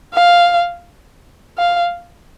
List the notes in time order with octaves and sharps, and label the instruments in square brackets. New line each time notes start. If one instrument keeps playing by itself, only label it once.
[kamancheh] F5
F5